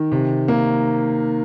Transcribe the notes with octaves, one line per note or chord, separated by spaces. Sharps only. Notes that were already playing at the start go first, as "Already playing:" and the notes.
Already playing: D#3
C3
A#3